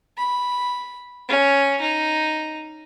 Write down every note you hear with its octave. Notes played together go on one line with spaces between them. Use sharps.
B5
C#4
D#4